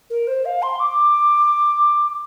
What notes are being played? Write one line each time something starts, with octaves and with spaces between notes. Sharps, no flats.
A#4
C5
F5
C6
D6